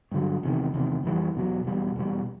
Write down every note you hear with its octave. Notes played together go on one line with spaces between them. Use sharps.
G2 D3 F#3
E2 C3 D#3
E2 C3 D#3
F2 C#3 E3 G3
E2 B2 F#3
E2 B2 G3
E2 B2 G3